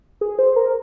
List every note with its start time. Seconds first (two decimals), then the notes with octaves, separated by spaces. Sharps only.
0.21 G#4
0.39 C5
0.56 A#4